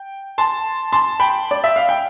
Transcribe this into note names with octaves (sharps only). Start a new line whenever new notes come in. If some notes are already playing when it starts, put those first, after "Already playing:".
Already playing: G5
A5 C6
A5 C6
G5 B5
D5
E5
F5
G5